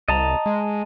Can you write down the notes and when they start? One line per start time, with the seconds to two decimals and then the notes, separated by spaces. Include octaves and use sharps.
0.08 C2 D#5 A5 A#5
0.46 G#3